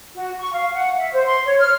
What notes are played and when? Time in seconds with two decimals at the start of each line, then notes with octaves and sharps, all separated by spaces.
0.16 F#4
0.39 C#6
0.52 F5
0.75 F#5
0.98 E5
1.13 C5
1.25 C6
1.46 C#5
1.60 F6